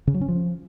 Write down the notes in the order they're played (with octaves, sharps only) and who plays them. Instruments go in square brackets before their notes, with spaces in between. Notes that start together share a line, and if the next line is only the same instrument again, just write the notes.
[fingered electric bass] C#3
F#3
C#4
F3